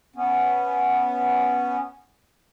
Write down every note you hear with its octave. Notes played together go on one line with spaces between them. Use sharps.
B3 C#4